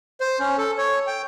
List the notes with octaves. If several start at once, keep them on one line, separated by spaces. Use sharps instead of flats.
C5
C#4
A4
C#5
G5